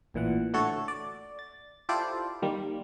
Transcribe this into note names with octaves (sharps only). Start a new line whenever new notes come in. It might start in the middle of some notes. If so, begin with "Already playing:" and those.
A1 A#2 E3 F#5
D3 A3 F#4 A4 C#5
D5
A6
E4 F4 G4 A4 C5 D5
D#3 G3 A#3